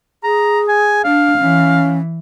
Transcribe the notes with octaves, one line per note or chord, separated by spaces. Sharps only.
G#4 A#5
G#5
D4 F5
E3 C#4